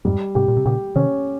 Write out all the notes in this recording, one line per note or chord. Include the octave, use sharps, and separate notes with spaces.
F2 G#2 G3
G#2 C3 G4
A#2
C3
A#2 C#3 G4
C3 D#3 C#4